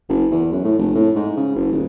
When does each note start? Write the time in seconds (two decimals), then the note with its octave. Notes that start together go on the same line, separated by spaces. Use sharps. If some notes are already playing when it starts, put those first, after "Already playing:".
0.09 F#1
0.32 E2
0.52 F#2
0.64 A2
0.78 F1
0.95 A2
1.16 G#2
1.37 C#3
1.55 F#1
1.72 D#1